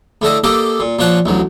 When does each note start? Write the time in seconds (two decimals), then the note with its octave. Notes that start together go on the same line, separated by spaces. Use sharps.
0.22 A2 D3 A4 D#5
0.44 A#3 G4 A4 D#5
0.80 A#2
0.99 A#2 F3 C#5 F#5 A5
1.26 A1 D2 F#3